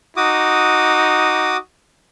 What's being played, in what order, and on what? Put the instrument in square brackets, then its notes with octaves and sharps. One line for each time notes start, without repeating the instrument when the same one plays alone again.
[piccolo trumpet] D#4 [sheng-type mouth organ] F#4 D6 D#6